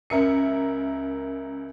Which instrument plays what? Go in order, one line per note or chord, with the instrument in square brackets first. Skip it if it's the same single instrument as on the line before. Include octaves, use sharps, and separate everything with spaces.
[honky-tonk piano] C#2 A#4 E5 C#7